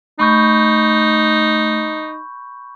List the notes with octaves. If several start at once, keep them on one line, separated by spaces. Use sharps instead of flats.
A3 D#4 B5 C#6 G6